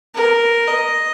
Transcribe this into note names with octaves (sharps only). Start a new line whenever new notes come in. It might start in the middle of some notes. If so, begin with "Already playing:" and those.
A#4
D#5